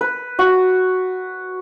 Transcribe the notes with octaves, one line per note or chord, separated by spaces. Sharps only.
B4
F#4